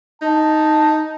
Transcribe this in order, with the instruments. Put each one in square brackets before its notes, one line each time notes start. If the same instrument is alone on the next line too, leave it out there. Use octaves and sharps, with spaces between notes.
[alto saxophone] D#4 [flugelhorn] A5